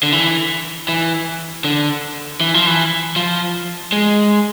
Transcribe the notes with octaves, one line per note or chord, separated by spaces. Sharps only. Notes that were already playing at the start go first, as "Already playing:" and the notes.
D3
E3
E3
D3
E3
F3
E3
F3
G#3